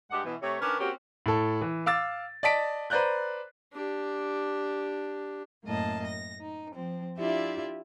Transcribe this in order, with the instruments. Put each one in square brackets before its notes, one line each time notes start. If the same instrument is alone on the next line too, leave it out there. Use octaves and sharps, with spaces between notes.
[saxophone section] G2 G#3 D4 G4 F#5
B2 E3
C3 A3 C#5
D#3 C#4 D4 A#4 B4
A#3 C4 C#4 F#4 G4
[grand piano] A2 A4
E3
F5 D6 E6 A6
D5 D#5 A5 B6 D7
B4 C5 D5 A#5 F#6 G6
[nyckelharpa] D4 G4
[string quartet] F#2 A2 A#3 D#5 A5
A#6
D#4
F3 C4
D4 E4 F4 G4 D5 E5